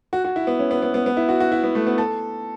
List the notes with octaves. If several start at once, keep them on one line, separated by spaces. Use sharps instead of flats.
F#4
F#4
E4
B3
C#4
B3
B3
B3
B3
E4
F#4
F#4
E4
B3
A3
B3
A4